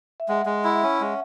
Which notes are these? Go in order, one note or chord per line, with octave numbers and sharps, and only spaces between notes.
E5
G#3 F#5
G#3
E4
C#4
G#3